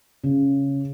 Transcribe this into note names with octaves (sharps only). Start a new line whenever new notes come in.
C#3